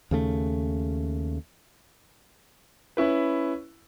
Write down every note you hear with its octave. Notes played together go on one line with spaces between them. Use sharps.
D#2 C#3 A3
C#4 E4 B4